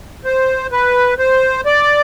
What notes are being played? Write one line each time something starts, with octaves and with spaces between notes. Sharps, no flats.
C5
B4
C5
D5